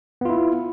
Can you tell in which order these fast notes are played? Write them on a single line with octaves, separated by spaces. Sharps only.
B3 F4 E4